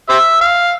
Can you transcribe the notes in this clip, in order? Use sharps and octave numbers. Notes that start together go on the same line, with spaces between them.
G4 C5 E5
F5